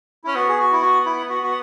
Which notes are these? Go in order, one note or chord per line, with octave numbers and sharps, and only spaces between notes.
C#4 E4
B3 F#4
G#4
F#4
E4
F#4
E4
F#4
F#4